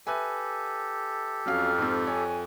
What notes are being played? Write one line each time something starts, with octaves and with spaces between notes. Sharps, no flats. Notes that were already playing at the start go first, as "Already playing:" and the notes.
G4 A4 B4 E5 G#5
F2 F#3 C#4 F5 F6
G#2 C4
C#5 G#5